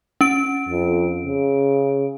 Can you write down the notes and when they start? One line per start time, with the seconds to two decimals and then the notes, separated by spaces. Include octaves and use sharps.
0.21 C#4 D7
0.69 F2
1.25 C#3